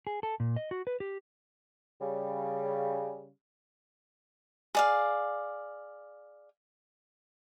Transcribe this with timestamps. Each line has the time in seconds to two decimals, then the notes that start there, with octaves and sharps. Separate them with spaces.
0.07 G#4
0.23 A4
0.40 A#2
0.56 D#5
0.71 F#4
0.87 B4
1.00 G4
2.01 C#3 G3
4.75 G#4 D5 F5